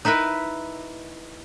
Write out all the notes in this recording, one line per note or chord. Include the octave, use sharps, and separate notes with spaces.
D#4 E4 A#4 B4